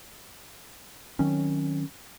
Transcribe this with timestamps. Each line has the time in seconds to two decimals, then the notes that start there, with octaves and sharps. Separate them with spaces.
1.19 D#3 F#3 C4 C#4